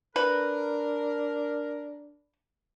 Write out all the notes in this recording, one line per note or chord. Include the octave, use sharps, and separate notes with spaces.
D4 A#4 B4